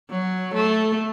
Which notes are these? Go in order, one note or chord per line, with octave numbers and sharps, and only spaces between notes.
F#3
A3